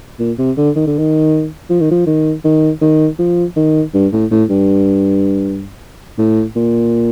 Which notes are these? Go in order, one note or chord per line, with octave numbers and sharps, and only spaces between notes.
A#2
C3
D3
D#3
D3
D#3
F3
D#3
F3
D#3
D#3
D#3
F3
D#3
G2
A2
A2
G2
A2
A#2